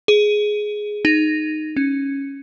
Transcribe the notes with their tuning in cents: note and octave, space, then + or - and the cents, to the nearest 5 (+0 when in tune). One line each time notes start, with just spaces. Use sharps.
G#4 +10
D#4 -10
C#4 -5